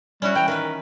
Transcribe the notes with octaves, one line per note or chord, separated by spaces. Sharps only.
G3 C#4 E4 F#4
E3 G5 A#5
D#3 E3 A#4 B4